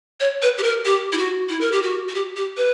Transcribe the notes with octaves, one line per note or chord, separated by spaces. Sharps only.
C#5
B4
G4
A#4
G4
E4
F#4
E4
A#4
G4
F#4
F#4
G4
G4
B4